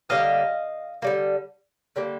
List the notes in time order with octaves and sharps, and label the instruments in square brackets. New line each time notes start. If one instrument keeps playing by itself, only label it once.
[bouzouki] D3 G3 A#3 D#5 F5
D3 G3 A#3
D3 G3 A#3